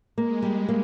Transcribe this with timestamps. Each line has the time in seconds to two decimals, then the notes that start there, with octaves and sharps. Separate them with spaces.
0.17 G#3 A#3
0.42 G3
0.69 A#3